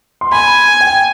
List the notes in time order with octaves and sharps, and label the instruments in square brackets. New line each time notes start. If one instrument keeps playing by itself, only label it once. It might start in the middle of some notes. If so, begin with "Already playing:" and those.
[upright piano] C6
[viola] G#5 [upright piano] B5
[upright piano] G5